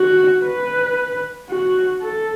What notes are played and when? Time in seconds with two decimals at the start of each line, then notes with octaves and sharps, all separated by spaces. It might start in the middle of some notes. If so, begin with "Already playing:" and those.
Already playing: F#4
0.44 B4
1.50 F#4
2.02 A4